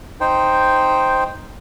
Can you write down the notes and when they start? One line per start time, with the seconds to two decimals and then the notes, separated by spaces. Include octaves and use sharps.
0.20 D#4 C5 G5